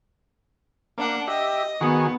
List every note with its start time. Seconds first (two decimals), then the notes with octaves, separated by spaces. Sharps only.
0.98 A#3 D4 F#5
1.28 G4 D#5 E5
1.81 D#3 B3 F#4 G#4